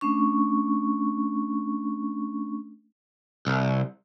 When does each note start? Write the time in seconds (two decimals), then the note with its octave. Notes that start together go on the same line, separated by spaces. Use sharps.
0.01 A3 C#4 D4 C#6
3.47 C2